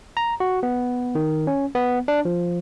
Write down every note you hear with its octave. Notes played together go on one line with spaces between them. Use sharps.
A#5
F#4
B3
D#3
C#4
B3
D4
F3